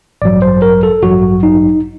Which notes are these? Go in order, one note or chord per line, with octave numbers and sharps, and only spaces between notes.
A1 G2 F#3 D5
C5
A#4
A4
A1 G2 F#3 F#4
D#4